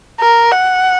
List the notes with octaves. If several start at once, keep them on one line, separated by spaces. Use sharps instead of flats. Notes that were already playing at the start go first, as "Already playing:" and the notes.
A#4
F#5